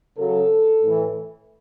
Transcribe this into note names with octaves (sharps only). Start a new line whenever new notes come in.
C#3 F#3 A4
A2 E3